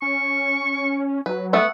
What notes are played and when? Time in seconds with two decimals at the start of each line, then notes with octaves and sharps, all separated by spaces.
0.02 C#4 C#6
1.26 F#3 B4
1.53 A3 B3 A4 F#5